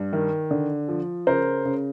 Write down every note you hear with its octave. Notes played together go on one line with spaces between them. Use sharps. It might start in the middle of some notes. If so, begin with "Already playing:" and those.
Already playing: G2
D#3
D3
F3
C#3 A#4 C5
C#3